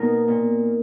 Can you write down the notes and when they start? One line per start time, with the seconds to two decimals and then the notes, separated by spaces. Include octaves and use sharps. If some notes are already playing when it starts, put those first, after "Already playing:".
Already playing: B2 A#3 D#4 A#4
0.28 A#2